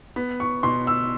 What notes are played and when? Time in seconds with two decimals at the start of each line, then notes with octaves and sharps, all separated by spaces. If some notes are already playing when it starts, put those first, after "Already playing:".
0.16 B3
0.40 C#6
0.63 B2 C6
0.87 E6